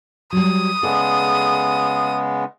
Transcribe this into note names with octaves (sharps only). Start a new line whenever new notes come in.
F#3 G3 D#6
C#3 G#3 B3 A4 D5